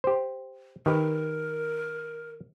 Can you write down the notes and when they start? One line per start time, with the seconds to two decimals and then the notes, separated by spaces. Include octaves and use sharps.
0.04 G4 C5
0.86 D#3 G4 A#4 B4